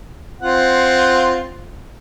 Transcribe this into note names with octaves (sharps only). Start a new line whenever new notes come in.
C4 F4 F#5